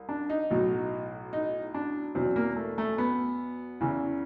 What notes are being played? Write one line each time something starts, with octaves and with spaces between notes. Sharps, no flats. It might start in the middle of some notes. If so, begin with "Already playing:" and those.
Already playing: C2
D4
D#4
B1 A2 F#3
D#4
D4
E2 B2 F#3 C4
A#3
A3
A3
B3
E2 C#3 E3